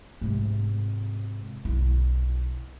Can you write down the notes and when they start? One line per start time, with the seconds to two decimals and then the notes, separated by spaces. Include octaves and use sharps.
0.21 G#2 C3
1.65 B1 E4